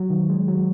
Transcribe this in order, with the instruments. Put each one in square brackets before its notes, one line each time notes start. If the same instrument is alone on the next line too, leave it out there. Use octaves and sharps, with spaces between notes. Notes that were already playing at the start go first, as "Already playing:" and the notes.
Already playing: [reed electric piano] F#3
D#3
G#3
F#3